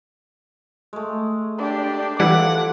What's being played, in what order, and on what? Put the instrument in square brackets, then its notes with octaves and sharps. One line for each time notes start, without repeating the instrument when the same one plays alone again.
[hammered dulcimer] G#3 A3
[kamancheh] D4 G4
[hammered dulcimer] D3 F3 [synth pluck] E3 G3 [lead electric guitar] F#5 [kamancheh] D6